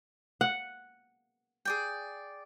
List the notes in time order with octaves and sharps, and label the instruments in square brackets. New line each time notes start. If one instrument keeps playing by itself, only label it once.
[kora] F#5
[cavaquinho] G#4 D5 G5